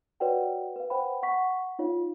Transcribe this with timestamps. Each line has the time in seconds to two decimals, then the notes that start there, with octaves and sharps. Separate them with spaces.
0.20 F#4 B4 C#5 D5 F#5 G5
0.76 B4 F5
0.90 C5 F#5 G5 B5
1.23 F#5 C#6 B6
1.79 D#4 F4 C#5 F5